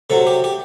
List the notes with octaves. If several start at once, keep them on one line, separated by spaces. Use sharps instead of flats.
C3 F#3 A4
G4
G4